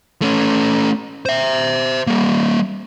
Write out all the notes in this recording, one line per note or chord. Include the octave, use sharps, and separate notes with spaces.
A3 C#4
C5 E5
G3 A#3